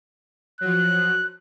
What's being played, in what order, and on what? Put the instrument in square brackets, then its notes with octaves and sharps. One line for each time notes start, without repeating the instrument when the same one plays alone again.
[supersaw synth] F3 F#3 [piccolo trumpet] F#6